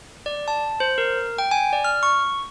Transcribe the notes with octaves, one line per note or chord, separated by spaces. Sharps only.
D5
A5
C5
A#4
G5
G#5
D5
F6
C#6